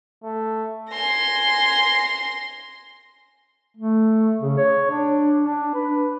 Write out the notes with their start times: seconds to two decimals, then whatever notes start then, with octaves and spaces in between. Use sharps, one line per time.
0.23 A3
0.93 G#5 C6 A#6
3.77 A3
4.41 C#3
4.58 C#5
4.90 D4
5.42 D4
5.74 B4